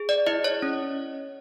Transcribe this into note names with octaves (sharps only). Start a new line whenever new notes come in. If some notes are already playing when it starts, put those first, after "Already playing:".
Already playing: G#4
D5
E4 D#5
C#5
C#4